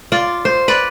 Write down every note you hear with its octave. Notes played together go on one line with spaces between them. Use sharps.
F4 D5
C5
B4 D5